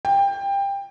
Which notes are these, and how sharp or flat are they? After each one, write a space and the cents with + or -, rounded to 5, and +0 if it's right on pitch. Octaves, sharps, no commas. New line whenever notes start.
G5 +20